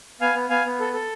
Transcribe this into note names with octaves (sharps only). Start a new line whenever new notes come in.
B3 F5 G#5
B3
B3 F5 G#5
B3
A4
A4